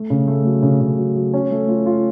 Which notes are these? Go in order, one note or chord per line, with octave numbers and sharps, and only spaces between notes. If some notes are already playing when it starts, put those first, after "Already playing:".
Already playing: A3
C#3
A3
F#3
C#3
C#3
F#3
F#3
C#4
A3
F4
F4